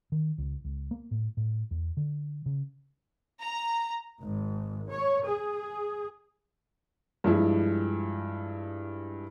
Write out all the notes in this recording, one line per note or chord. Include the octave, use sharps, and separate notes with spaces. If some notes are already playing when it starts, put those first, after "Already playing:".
D#3
C#2
C#2
A#3
A2
A2
E2
D3
C#3
A#5
G#1
C#5
G#4
G2 F3 G#3 E4